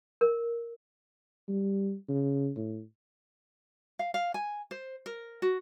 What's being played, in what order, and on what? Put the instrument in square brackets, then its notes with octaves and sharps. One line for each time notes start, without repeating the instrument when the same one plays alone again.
[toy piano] A#4
[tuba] G3
C#3
A2
[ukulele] F5
F5
G#5
C5
A#4
F#4